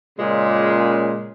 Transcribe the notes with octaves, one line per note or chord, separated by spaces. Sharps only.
A#2 C#3 G#3